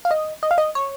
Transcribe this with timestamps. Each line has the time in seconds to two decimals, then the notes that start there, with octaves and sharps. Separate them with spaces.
0.05 F5
0.11 D#5
0.43 D#5
0.51 F5
0.58 D#5
0.75 C#5